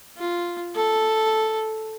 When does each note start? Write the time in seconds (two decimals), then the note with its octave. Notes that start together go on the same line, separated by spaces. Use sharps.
0.17 F4
0.76 A4